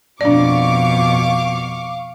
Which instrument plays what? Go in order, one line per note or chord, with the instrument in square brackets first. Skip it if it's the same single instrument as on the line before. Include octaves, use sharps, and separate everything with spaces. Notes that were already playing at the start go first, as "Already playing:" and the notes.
[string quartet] F2 B2 [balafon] D4 D5 [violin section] F5 C#6 D6